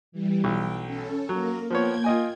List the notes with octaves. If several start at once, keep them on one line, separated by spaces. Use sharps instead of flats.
E3 G3
B1 G5
C#4 A4
F#3 A#3 A#4
F3 A#3 B3 C#5 G5 G#6
F4 D#5 G#5